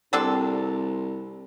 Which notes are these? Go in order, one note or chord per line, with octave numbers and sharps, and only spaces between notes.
C2 C4 D4 A4